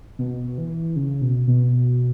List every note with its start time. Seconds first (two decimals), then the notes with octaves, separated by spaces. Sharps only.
0.19 B2
0.58 E3
0.96 C#3
1.22 B2
1.47 B2